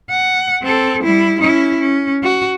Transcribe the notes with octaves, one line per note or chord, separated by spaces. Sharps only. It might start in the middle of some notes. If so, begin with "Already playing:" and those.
F#5
C4 A4
G3 E4
C#4 E4
C#4
F#4